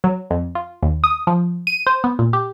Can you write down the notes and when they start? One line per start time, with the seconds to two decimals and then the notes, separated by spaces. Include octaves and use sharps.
0.04 F#3
0.30 F2
0.55 F4
0.83 D#2
1.04 D#6
1.27 F3
1.67 D#7
1.87 C5
2.04 B3
2.19 A#2
2.33 G4